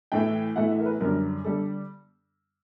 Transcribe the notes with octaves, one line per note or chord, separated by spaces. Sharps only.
A2 E3 A3 G5
A2 E3 A3 F#5
E5
A#4
B4
F#2 D3 G3 A#4
D3 G3 A4